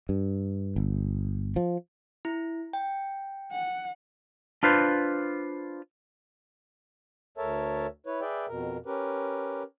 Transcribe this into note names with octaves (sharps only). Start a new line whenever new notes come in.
G2
G1
F3
E4
G5
F#5
D4 F4 B4 C5
D2 A4 A#4 C#5 E5 A5
E4 B4 C#5
G#4 B4 D5 E5 G5
F2 B2 A#4
C#4 G4 A#4 B4